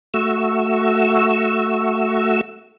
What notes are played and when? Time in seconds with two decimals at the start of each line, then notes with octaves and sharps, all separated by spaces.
0.14 A3 F#4 E6